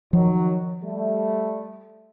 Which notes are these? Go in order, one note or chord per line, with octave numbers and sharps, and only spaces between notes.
D#3 F3 F#3
G3 A3